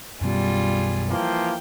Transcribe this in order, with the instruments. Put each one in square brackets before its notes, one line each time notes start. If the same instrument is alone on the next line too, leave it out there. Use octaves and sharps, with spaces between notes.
[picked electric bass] F#2 B2 F#3 [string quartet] G3 F4 G#4
[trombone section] E3 F3 A#3 [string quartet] G5